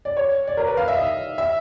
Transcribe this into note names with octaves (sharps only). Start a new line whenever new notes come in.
D5
C#5
D5
A#4
B4
F5
E5
D#5
E5